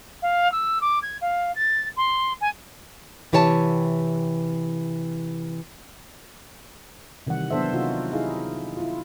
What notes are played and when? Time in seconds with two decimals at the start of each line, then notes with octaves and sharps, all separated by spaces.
0.22 F5
0.51 E6
0.81 D6
1.02 G#6
1.21 F5
1.55 A6
1.96 C6
2.40 G#5
3.32 C3 E3 G4 C#5 G#5 A5
7.27 C3 D#3 E3 G3 F#5
7.51 F#3 B3 D4 A4 C5 E5
7.73 C3 D#4 F4 F#4
8.12 D#4 E4 G#4 F5
8.77 E4 F4